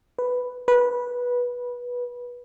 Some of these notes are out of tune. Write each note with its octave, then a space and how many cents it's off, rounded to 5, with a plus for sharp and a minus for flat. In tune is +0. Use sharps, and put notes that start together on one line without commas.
B4 +5
B4 -15